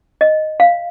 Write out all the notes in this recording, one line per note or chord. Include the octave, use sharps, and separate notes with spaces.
D#5
F5